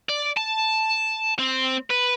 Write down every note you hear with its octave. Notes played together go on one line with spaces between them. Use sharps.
D5
A5
C4
B4